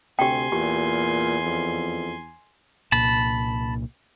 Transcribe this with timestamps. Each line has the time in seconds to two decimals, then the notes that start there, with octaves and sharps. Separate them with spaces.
0.19 D2 C3 G4 G5 G#5 C6
0.52 E2 A#2 G4
1.45 F2
2.92 C2 A#2 A5 B5